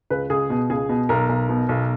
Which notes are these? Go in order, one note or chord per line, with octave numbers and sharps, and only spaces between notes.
C#2 B4
C#2 G#4
B2
C#2 G#4
B2
B1 A#4
B1
B2
B1